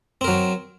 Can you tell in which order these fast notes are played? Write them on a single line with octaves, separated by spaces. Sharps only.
C4 A#4 F#3